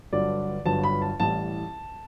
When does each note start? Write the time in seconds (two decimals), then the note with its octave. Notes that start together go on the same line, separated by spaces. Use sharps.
0.13 G1 G2 D3 F#3 D5
0.66 G1 G2 D3 F#3 A5
0.84 B5
1.02 A5
1.19 A1 A2 G3 A5